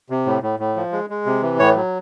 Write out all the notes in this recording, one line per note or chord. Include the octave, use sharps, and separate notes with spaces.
C3
A2
A2
A2
F3
G#3
G#3
C3
E3
A2 C#5
F#3